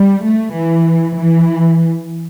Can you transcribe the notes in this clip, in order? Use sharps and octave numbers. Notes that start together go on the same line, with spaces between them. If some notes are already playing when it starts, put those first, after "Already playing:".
Already playing: G3
A3
E3
E3